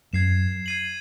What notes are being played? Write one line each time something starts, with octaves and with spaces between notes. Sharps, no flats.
F#2 G#6 C7 E7
G#6 C7 D#7 F#7